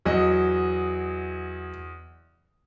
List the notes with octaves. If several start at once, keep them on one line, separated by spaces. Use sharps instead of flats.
E2 F#3 D#5